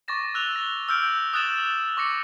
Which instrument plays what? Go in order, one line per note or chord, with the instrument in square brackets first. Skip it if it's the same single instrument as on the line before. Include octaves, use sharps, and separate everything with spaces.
[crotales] C#6 D6 A6 A#6 E7
E6 F#6 F7 G7
A#6 G7
E6 F6 G6 D7
D#6 F#6 A6 E7 F#7
C#6 D6 A#6 C#7